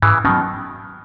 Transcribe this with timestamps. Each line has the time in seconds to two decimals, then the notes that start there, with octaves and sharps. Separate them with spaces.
0.02 G#2 C#3 E3
0.24 B2 D#3 F#3 C#4